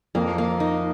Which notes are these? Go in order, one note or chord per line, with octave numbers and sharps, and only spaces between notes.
F2 A#3
A#3
D#4